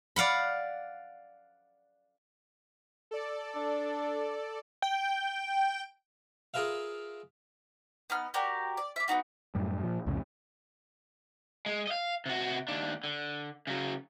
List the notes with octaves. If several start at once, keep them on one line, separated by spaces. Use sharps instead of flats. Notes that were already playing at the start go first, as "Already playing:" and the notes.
D5 F5 F#5 B5
A4 D5
D4
G5
F4 G#4 A#4 B4 E5 F5
B3 D#4 F6
F#4 G4 A#4 D5
D5
D5 E5
B3 D4 D#4 F#4
F#2 A2 G3
A#2 F3
C2 F2 A2 C#3
G#3
D#5 F5
C3 F#4
D#2 D4
D3
C#3 F#3